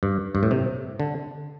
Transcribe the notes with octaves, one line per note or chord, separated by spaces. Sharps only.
G2
G2
A2
C3
D3